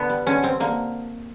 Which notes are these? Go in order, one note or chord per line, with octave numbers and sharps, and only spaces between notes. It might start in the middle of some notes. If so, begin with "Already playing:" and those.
Already playing: D3 B3
G3
D3 C#4
G3 C4
D3 A#3